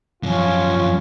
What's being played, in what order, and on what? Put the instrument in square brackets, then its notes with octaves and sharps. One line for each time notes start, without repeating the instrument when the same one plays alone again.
[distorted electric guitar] F#2 F3 [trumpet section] C#4 F4